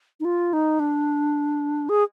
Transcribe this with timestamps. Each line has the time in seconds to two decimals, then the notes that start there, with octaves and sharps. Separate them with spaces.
0.20 D#4
0.25 F4
0.53 D#4
0.80 D4
1.89 G#4